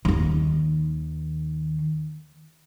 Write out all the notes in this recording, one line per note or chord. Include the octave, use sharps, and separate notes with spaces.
D#2 D#3